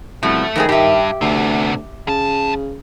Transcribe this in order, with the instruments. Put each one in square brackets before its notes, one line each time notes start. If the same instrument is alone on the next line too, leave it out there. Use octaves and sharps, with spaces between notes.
[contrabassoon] C2 [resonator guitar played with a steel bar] B2 F3 [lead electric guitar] A3
[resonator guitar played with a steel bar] F2 C4 G#4 [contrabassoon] D#3
[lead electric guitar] E2 G2 [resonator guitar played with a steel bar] G4 E5
[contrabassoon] D2 [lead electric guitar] C3 B3
[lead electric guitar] F2 A5 [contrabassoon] C#3